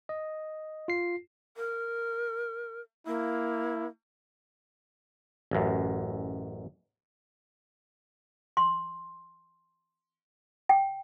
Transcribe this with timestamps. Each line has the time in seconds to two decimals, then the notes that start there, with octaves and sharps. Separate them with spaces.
0.09 D#5
0.88 F4 C7
1.57 A#4
3.07 A#3 E4
5.51 A1 F#2
8.57 C6
10.69 G5